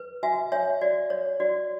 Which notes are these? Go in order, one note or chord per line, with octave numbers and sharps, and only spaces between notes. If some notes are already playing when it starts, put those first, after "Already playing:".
Already playing: B4
F#4 E5 G#5
C#5 E5 G#5
F#4 D5
C#5
F#4 D5